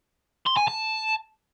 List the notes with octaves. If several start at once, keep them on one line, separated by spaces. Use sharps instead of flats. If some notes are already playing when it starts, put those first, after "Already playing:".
C6
G#5
A5